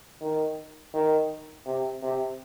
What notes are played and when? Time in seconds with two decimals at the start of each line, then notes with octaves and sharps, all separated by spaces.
0.21 D#3
0.94 D#3
1.66 C3
2.03 C3